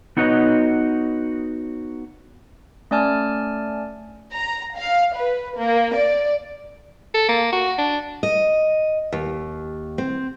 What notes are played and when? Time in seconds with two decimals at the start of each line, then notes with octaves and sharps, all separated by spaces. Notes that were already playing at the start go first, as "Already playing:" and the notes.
0.17 B3 D#4 F#4 B4 C#5 D#5
2.91 A3 C#4 D5 G#5 A5 F6
4.34 A#5
4.75 F5
5.16 B4
5.58 A#3
5.95 D5
7.14 A4
7.29 A#3
7.52 F#4
7.78 D4
8.23 D#5
9.13 D#2
9.98 C4